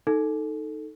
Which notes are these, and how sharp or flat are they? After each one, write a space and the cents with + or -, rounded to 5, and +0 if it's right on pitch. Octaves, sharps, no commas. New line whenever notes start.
D#4 +0 A4 +0